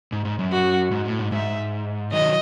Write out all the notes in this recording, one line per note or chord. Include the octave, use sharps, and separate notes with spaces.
G#2
G#2
F#2
F#4
G#2
A2
G#2
G#2 E5
D#3 F#3 D#5